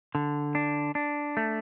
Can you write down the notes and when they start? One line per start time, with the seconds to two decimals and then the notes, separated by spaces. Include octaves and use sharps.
0.15 D3
0.55 D4
0.95 D4
1.37 A3